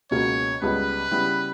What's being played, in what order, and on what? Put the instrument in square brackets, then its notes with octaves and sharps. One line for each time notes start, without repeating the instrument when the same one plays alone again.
[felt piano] C#2 B2 A#3 C#4 F#4 [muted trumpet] C#5
[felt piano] C#2 C#3 G3 B3 [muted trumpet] B4
[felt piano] C#3 G3 B3 E4 G4